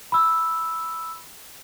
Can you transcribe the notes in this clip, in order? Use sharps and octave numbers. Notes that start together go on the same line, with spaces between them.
B5 E6